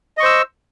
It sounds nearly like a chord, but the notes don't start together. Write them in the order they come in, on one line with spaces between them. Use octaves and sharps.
D#5 C#6 C5 E6